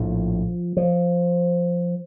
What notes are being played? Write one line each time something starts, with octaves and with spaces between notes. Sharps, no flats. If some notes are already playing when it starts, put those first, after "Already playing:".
Already playing: A#1 A2 F3
F3